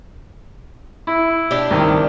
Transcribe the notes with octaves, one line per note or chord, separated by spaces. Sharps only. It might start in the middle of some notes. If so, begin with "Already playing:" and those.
E4
D4 G4
C2 D#3